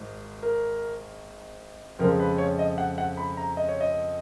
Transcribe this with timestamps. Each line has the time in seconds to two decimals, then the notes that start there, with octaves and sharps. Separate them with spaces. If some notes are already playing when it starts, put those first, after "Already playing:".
Already playing: G#1 G#2
0.43 A#4
1.99 F2 C#3 F3 G#3 A#4
2.20 B4
2.38 C#5
2.59 D#5
2.78 F#5
2.98 F#5
3.17 B5
3.37 A#5
3.57 D#5
3.68 C#5
3.81 D#5